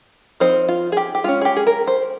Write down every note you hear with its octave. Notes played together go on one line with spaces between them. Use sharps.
F3 C4 D#4 C5
F4
G#4
G4
G4
G#3 C#4 F4
G#4
G4
G#4
A#4
C5